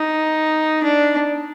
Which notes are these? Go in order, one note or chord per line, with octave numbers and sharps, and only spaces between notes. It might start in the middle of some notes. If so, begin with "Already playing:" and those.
Already playing: D#4
D4